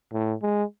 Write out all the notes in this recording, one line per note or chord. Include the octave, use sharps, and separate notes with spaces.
A2
G#3